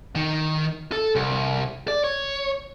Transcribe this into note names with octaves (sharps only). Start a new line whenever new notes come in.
D#3
A4
C2
D5
C#5